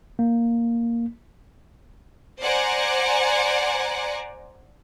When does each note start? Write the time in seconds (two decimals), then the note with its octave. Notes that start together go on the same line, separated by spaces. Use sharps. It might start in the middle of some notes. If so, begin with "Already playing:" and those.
0.19 A#3
2.41 C5 D5 F#5 G#5 A#5